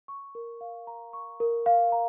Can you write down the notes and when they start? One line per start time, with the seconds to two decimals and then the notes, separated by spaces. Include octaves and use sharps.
0.08 C#6
0.35 A#4
0.61 F5
0.87 A#5
1.13 C#6
1.40 A#4
1.66 F5
1.92 A#5